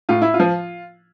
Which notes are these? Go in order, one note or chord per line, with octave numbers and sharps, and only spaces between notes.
A2 F4
E4
F4
F3